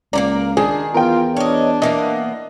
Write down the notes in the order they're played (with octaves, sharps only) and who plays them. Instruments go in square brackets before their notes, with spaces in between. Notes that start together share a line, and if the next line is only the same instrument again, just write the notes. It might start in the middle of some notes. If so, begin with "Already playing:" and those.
[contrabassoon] C#2 [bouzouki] A#3 C#4 D5 [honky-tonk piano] A#5
[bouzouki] D#3 [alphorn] D4 [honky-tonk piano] G#4
[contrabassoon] E2 [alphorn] F4 [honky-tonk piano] A#4 G5
[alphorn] D4 [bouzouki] C#5 D#5
[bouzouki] E3 A#3 B3 [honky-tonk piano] D#5